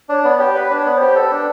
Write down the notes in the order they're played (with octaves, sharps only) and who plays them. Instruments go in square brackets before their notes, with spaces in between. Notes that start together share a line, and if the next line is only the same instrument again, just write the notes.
[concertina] D4 [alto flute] C#5
[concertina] B3 [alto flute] C#5
[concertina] G4 [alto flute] C#5
[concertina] B4 [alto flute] C#5
[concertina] D4
[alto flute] C#5
[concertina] B3
[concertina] G4 [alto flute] C5
[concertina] A4 [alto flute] B4
[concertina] D4